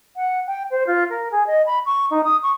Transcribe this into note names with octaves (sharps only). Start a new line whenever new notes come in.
F#5
G5
C5
F4
A#4
G#4
D#5
B5
C#6
D#4
D#6
C#6